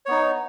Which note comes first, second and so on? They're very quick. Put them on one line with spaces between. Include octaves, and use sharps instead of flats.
C#5 B3 D#4